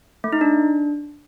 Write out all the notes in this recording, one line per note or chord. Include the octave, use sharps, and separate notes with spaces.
A3
D#4
D4